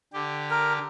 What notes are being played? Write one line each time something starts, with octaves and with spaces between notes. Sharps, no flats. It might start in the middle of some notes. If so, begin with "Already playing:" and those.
D3 G4
A#4